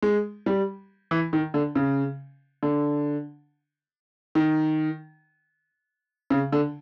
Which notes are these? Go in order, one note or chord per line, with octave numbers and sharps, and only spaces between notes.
G#3
G3
E3
D#3
D3
C#3
D3
D#3
C#3
D3